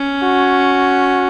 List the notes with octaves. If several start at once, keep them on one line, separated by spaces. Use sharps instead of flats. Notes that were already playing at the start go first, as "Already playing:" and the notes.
Already playing: C#4
F#4